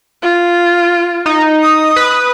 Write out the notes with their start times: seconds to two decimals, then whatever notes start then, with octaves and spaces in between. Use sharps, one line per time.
0.22 F4
1.26 D#4
1.62 D#6
1.96 B4